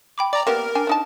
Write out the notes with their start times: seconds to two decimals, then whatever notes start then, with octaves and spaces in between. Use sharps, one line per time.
0.18 G5 B5 D6
0.33 D5 A#5 D6
0.47 A#3 B3 G4 A#4
0.75 D4 G5 G#5
0.87 D4 D#4 A5